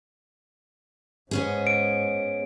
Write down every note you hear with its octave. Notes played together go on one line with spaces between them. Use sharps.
G#2 B3 C#4 G#4
D7